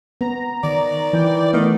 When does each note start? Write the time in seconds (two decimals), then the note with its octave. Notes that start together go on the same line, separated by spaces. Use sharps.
0.21 B3 A#5
0.64 D#3 D5
1.13 E3 G5
1.53 D#3 A3 B3